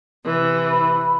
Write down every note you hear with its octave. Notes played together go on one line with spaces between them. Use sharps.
C3 E3
B5